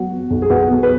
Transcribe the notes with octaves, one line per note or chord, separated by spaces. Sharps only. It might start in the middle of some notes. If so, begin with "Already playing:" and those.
Already playing: F#3 B3 F#4
B3
B1
G#4
B1 F#4 B4
B2
B4